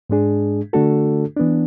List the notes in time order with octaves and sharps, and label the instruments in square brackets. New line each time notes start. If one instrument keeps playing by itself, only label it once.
[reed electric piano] G#2 G#3 D4 G#4
D3 A3 D4 F#4 A4
E3 B3 D4